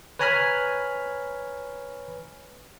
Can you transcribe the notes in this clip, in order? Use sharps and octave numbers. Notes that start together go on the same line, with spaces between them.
B4 C#5 G#5 A#5 B5 F6